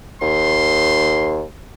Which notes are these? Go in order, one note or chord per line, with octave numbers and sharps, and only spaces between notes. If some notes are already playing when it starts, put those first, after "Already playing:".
D#2 C6